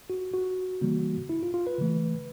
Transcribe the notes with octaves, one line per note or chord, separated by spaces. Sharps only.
F#4
F#4
C#3 E3 G3 A#3
E4
F4
F4
B4
C#3 E3 A3